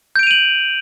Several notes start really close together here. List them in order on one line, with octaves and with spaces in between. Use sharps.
G6 D7 F7 D#7 F#7